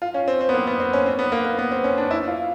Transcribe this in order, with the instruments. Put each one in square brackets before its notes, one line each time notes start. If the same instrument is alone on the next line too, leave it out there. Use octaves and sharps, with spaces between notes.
[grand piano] F4
C#4
C4
C4
B3
A#3
B3
C4
C#4
C4
B3
A#3
A#3
B3
C4
C#4
D4
E4
F4